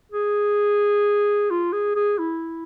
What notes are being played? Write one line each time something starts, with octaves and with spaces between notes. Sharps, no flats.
G#4
F4
G#4
G#4
E4